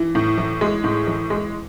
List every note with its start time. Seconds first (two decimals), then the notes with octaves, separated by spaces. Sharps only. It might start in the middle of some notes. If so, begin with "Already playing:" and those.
Already playing: E3
0.15 A2
0.38 E3
0.61 G#3
0.84 A2
1.07 E3
1.30 G#3